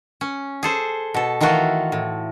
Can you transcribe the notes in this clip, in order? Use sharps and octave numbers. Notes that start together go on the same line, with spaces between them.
C#4
G#4 A4 C5
B2 A4
D#3 E3 A3 F4 F#4
A2